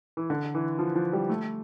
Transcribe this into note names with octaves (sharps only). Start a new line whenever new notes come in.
E3
D3
E3
F3
F3
G3
A3